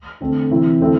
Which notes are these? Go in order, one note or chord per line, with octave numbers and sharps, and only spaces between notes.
D3 A3 C4
C3 E3 C4 E4
D3 A3 C4 E4